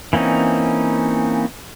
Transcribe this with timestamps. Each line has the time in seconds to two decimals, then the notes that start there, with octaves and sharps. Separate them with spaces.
0.13 E3 A#3 C4 C#4 D#4